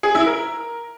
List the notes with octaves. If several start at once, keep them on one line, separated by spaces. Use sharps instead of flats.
G#4
E4
A#4